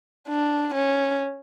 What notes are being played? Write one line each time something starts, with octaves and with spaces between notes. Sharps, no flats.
D4
C#4